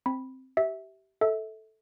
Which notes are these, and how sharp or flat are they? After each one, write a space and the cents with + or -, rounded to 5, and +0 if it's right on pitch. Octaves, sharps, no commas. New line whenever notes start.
C4 +0 B5 -5
G4 -25 E5 -15
A4 +0 E5 -30